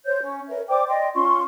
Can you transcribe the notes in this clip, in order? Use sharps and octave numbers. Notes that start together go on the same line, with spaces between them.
C5 C#5 G6
C#4
A#4 B4 C#5 E5
C5 D5 G5 D6
D5 D#5 G5 C6
C#4 F4 C6 C#6